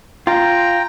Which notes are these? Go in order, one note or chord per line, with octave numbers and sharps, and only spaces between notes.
F4 G5 A#5